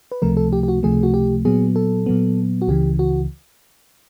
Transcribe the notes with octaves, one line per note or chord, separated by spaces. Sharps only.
B4
C#2 C3 F3 A3 A#4
A4
G4
G4
F#4
C#2 C3 F3 A3 G#4
F#4
G4
A#2 F#3 B3 G#4
A4
A#2 F#3 B3
F#4
C#2 C#3 E3 G4
F#4